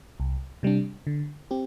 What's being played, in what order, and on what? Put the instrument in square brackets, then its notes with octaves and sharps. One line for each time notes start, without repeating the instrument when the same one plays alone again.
[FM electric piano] C2
C3 G3 D4
D3
C4 G4